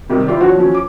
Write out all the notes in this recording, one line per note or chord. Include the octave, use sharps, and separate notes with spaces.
C3 D#3 G3
E4 F4 G4 D5
F3 D4 F#4 C#5
F3 F#3 C#4
D6